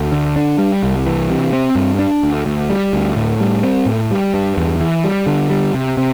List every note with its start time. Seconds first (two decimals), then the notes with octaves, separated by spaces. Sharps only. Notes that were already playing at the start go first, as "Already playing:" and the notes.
Already playing: D2
0.12 D3
0.36 D4
0.58 G3
0.83 C2
1.06 E3
1.30 C3
1.53 C4
1.75 G2
1.99 D4
2.23 D2
2.46 D2
2.70 G3
2.93 D2
3.16 A2
3.40 G3
3.63 C4
3.86 A2
4.11 G3
4.34 G2
4.57 E2
4.80 E3
5.04 G3
5.27 D3
5.50 G3
5.74 C3
5.97 C3